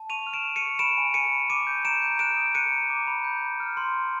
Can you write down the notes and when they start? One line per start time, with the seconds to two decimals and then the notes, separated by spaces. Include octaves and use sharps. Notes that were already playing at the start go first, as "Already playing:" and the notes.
Already playing: A5
0.10 C#6 D#7 F7
0.27 F6
0.33 D7 E7
0.45 C#6
0.56 C#7 D#7
0.62 C#6
0.79 B5 D7 E7
0.97 G#5
1.14 G#5 C#7 D#7
1.32 B5
1.50 D6 C#7 D#7
1.67 G6
1.85 A#5 D7 E7
2.02 G6
2.19 F#6 D7 E7
2.37 D#6
2.54 F#6 C#7 D#7
2.72 A#5
2.90 D6
3.07 B5
3.24 G6
3.42 B5
3.60 F6
3.77 C6
3.94 C6